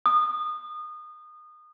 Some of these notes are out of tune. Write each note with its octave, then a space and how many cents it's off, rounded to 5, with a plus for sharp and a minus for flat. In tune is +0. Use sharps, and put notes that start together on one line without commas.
D#6 -25